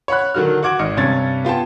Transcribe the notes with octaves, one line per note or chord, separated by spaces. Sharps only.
C#5 F#5 B5 F#6
D3 D#3 F#3 F#4 F6
F#4 F#5 D6 G#6 D7 F#7
G#1 D#5 F6 C#7
G2 C3 C#4 G#6 A6
B3 F4 G5 A5